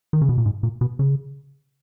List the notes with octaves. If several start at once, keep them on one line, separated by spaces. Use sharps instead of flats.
D#3
C#3
B2
A#2
G#2
A#2
B2
C#3